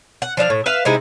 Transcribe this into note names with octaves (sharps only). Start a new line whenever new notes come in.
F#5
F3 D4 E5 F5
A2
B4 E5 F5
C3 G#3 D#4 E4